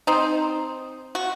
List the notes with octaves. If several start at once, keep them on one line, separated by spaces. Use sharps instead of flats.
C4 D#4
F#4